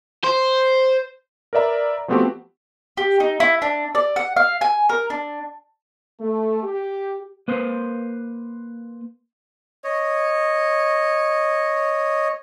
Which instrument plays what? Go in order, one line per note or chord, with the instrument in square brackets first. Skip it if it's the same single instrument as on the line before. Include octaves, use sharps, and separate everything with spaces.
[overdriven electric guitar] C5
[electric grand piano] A#4 B4 D5 E5 A#5
F3 A3 B3 C4 F#4 G4
[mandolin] G4
D#4
E4
D4
D5
F#5
F5
G#5
A#4
D4
[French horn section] A3
G4
[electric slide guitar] A#3 B4 C5
[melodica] C#5 D#5